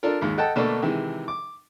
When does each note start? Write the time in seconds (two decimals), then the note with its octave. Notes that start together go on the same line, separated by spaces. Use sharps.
0.03 D4 F4 A4 A#4
0.21 D#2 G#2 G#3
0.38 A4 D#5 F#5 G5 A5
0.56 B2 D3 A3 A#3 D4 A4
0.82 C3 D#3 E3 G#3
1.28 D6